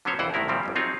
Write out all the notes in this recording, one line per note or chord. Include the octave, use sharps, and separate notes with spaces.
D3 F#3 B3 C#4 C5 C#5
C2 F2 E3 C5 F#5 G5
C2 A2 D#3 E4 A#4
A#2 D#3 F3 G3 C4 G4
G1 F2 C#4
F#3 C4 D#4 F4 G#4 C#5